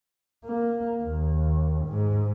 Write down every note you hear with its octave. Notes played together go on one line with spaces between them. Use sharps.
A#3
D#2
G#2